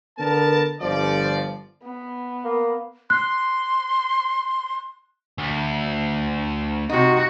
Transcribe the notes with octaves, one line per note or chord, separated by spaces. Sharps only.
D3 B3 A#4 A5
G1 F3 D5
B3
A#3
C6 F#6
D2
C3 D#4 F#4